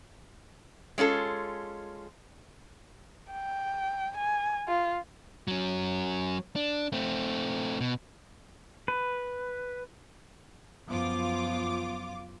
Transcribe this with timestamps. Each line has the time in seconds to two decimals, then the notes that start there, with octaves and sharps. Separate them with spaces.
0.98 G#3 C#4 F4 A4
3.32 G5
4.17 G#5
4.68 F4
5.48 F#3 C#4
6.56 D4
6.92 A3 C4
7.81 B2
8.88 B4
10.88 F#2 F3 B3 F4 D6